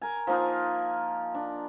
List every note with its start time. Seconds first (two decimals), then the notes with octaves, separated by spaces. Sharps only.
0.02 A#4 G#5
0.27 F3 A#3 D#4 F4
1.35 D4